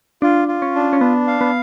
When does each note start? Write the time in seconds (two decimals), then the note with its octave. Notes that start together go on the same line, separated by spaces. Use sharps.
0.22 D4 F4
0.48 F4
0.62 C#4
0.75 D4
0.93 C#4
1.01 B3 D4
1.27 F5
1.41 B3